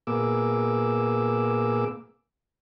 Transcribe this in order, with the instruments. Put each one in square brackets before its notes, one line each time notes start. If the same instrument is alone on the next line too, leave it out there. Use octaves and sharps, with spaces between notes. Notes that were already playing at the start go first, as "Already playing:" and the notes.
[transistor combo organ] A#2 A#3 B3 G#4 D6 E6